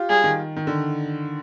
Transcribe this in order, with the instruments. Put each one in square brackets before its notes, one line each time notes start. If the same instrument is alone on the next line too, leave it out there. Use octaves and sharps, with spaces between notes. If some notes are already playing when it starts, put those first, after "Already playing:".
Already playing: [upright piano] F4 G4
[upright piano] G3 [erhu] G#4
[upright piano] D#3
D#3
D3